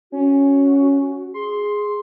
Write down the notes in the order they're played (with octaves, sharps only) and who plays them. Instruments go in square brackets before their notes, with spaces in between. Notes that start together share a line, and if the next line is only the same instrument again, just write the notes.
[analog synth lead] C#4 [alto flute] F#4
[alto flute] G#4 [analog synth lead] C6